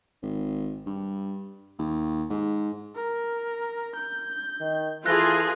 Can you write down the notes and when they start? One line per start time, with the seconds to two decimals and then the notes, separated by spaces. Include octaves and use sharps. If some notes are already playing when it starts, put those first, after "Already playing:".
0.23 G#1
0.86 G2
1.79 D#2
2.30 G#2
2.96 A#4
3.96 G6
4.60 D#3
5.06 E3 F4 G#4 A4 F#6 A#6